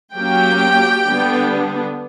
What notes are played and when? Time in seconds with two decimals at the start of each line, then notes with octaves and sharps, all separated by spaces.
0.14 F#3 A#3 C#4 G4 G5
1.06 D3 G3 B3 D4